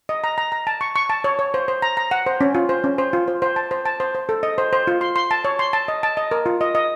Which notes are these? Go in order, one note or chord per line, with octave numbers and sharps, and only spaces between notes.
D#5
A#5
A#5
A#5
A5
C#6
C#6
A5
C#5
C#5
C5
C5
A#5
A#5
F#5
C5
C#4
F4
C5
C#4
C5
F4
C5
C5
A5
C5
A5
C5
C5
A4
D#5
C5
C5
F4
C6
C6
A5
C#5
C6
A5
D#5
A5
D#5
A#4
F4
D#5
D#5